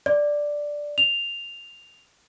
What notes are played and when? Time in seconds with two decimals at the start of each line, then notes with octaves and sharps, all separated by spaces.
0.06 D5
0.98 F7